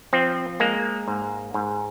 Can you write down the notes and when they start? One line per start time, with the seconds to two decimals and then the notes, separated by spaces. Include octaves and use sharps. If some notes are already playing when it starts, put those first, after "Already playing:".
0.13 F3 C4
0.60 G#3 A#3
1.08 G#2
1.54 G#2